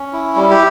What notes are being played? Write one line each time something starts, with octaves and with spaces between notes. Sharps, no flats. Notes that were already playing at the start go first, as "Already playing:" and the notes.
Already playing: C#4
E4
G3
G4